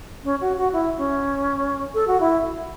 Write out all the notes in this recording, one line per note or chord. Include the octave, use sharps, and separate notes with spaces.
C#4
F#4
F#4
E4
C#4
A4
F#4
E4